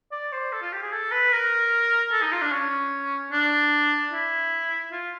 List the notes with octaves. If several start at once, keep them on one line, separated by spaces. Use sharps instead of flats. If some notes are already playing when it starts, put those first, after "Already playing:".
D5
C5
A4
F4
G4
G#4
A4
B4
A#4
A4
D#4
F4
D4
C#4
D4
E4
F4